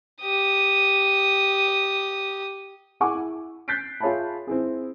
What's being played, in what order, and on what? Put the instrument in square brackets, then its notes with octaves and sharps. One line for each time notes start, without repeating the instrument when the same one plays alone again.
[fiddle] G4 D#6
[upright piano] E4 G#4 F#5 G#5 C#6 D6
E4
F#6 G6 A6 B6 C7 D7
F4 G#4 C#5 E5 A5 B5
C4 E4 G#4